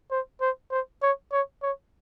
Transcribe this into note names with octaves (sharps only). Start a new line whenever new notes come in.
C5
C5
C5
C#5
C#5
C#5